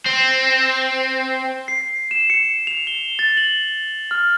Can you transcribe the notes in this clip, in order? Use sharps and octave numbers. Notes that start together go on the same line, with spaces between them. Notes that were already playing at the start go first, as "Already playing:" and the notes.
C4
C7
E7
C#7
F7
G7
A6
F#7
F6